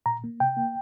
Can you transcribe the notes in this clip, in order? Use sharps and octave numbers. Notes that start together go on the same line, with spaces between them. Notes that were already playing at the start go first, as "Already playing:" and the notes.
A#2 A#5
A#3
C3 G5
A#3